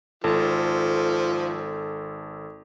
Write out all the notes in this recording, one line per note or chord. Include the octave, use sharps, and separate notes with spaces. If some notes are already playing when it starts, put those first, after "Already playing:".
G#1 F3 A4